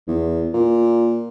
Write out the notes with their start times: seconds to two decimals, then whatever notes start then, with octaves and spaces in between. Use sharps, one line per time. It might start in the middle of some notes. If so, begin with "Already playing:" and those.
0.08 E2
0.54 A#2